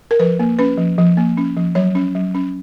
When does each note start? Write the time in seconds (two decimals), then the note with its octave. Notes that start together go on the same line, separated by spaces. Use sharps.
0.11 A#4
0.20 F3 B4
0.39 A#3
0.59 C#4 B4
0.78 F3
0.98 F3
1.17 A#3
1.37 C#4
1.57 F3
1.75 F#3 C#5
1.95 C#4
2.15 F#3
2.34 C#4